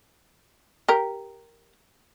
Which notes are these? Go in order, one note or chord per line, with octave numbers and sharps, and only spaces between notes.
G4 A#4